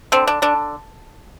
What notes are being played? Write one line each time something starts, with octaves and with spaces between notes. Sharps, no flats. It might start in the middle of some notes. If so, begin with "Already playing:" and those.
D3 C4
D4
D3 D4